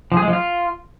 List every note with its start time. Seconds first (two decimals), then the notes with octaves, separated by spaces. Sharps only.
0.12 F3
0.17 G#4
0.22 G#3
0.28 F3
0.33 F4